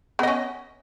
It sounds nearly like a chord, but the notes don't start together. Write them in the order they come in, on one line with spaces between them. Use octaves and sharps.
B3 D#5 C#4